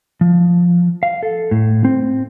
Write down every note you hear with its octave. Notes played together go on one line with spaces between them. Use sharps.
F3
F5
A4
A2
C4